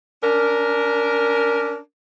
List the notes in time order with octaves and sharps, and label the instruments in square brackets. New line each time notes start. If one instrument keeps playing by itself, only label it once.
[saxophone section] C#4 D4 A#4